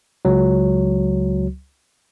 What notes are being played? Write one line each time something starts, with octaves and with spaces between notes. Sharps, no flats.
C#2 F#3